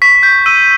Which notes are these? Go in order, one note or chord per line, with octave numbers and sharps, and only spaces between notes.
C#6 B6
G6 B6
E6 D#7